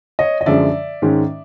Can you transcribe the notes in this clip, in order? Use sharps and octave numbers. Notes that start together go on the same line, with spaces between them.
C#5 D#5
D#5
F#2 D3 F3 G#3 D5 E5
G#2 D#3 G#3 C#4